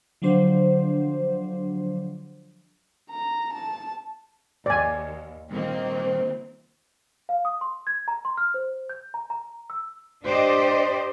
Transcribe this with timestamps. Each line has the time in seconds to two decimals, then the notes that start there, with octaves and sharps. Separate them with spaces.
0.22 D3 F3 F#3 D4 C5
3.10 A#5
3.53 A5
4.66 D#2 D5 G#5
5.51 C2 A#2 D#3 A#3 C4
7.29 F5
7.45 D#6
7.61 C6
7.87 G#6
8.08 A#5
8.25 C6
8.37 F6
8.54 C5
8.89 G6
9.14 A#5
9.30 A#5
9.70 E6
10.24 D4 G4 C5 D5 D#5